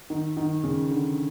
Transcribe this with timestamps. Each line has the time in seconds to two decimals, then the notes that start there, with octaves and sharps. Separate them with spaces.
0.10 D#3
0.37 D#3
0.63 C#3
0.91 D3